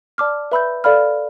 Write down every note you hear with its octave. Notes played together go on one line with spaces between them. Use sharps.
D5 A5 D6 F6
B4 E5 B5 E6 G6
A4 D5 F5 B5 F6